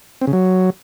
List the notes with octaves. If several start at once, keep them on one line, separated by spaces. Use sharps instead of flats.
C4
C#3
F#3